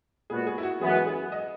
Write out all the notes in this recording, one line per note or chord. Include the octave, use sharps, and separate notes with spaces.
A#2 G#3 B3 F#4 G#4
G#4
E4
F#4
F#2 E3 G#3 B3 G#4
F#4
G#4
G#4
D#5